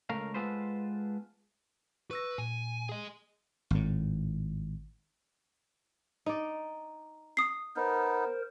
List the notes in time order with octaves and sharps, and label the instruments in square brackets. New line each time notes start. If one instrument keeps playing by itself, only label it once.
[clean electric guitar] C#2 A3 A#4 F5
G#3 B3 F4 A4 B4 C5
[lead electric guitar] B4 [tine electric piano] C#6 E6 A#6
[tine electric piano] A#2 [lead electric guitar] G#5
[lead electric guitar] G#4 D#5
[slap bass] G#1 A2
[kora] D#4 D5
[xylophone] D#6 C7
[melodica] B3 D#4 [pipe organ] A#4 C5